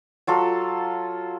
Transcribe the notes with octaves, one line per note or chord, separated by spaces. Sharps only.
F#3 F4 A4